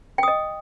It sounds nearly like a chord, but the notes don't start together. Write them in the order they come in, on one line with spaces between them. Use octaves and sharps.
G5 D#6 D#5